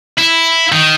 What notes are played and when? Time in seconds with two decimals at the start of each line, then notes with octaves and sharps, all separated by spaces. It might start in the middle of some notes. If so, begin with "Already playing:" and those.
0.18 E4
0.72 D#3